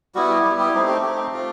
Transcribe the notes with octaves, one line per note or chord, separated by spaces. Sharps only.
G3 B3 E4 F#4
G4
G3 B3 E4 G4
G4
A3 C4 D#4
G4
A3 C4 D#4 G4
A3 C4 F4